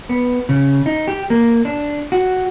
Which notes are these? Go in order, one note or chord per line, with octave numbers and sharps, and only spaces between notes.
B3
C#3
D#4
G4
A#3
D4
F#4